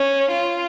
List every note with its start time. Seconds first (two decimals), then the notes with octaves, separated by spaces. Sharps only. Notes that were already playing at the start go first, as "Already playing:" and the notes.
Already playing: C#4
0.33 F4